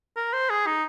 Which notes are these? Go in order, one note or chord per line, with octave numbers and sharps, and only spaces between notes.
A#4
C5
G#4
D#4